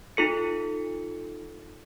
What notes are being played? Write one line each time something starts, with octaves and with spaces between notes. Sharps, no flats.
D#4 F4 A4 C#7